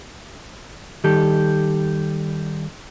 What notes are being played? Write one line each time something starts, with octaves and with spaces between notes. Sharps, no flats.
D#3 G3 G4 A4